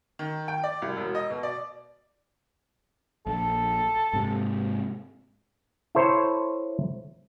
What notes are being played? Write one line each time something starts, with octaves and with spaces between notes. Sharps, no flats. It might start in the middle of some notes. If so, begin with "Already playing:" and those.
D#3
G5
D5
C2
E1
D#5
B2
D5
A#1 A4
G#2 C3
E4 A4 C5 C#5